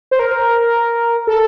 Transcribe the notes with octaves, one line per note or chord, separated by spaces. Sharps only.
C5
A#4
A4